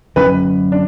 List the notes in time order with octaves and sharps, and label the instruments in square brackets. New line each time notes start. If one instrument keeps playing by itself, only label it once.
[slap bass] D3 F#3 C#4 [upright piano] B4
[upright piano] D4